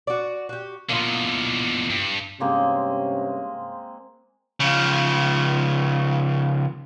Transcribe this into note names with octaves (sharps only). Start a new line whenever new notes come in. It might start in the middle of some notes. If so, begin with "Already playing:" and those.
F#4 D5
F#4 G4
B2 D3 A#3 E4 F4
G2
G2 C3 G#3 A#3 C4 C#4
C#3 F3